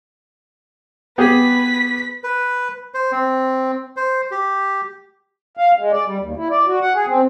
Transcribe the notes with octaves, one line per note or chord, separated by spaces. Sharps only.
B3 G4 G#4 B4 B6
B4
C5
C4
C5
G4
F5
G#3
D5
G3
D#2
E4
D5
F#4
F#5
G#4
C4